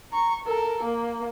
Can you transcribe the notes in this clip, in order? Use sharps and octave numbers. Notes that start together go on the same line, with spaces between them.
A#5 C#6
A4 A#4
A#3